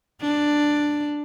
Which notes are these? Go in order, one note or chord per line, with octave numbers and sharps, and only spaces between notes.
D4